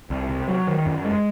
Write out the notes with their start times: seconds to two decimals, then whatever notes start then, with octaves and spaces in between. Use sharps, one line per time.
0.10 C2
0.29 C3
0.48 F#3
0.67 D#3
0.86 F#2
1.04 G#3